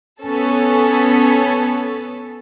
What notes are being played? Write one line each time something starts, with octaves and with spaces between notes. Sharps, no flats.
B3 C#4 A4